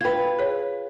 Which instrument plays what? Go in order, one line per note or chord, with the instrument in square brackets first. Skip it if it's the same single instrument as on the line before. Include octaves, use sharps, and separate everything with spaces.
[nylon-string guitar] F4 B4 [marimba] G5 G#6
[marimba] G#4 C#5